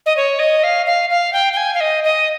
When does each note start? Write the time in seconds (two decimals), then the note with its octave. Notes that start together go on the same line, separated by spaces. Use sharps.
0.06 D#5
0.17 C#5
0.39 D#5
0.64 F5
0.86 F5
1.10 F5
1.33 G5
1.53 G5
1.57 G#5
1.74 F5
1.80 D#5
2.04 D#5